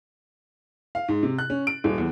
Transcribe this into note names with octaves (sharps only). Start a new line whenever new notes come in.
F5
G#2
C3
F#6
C#4
D7
D#1
E2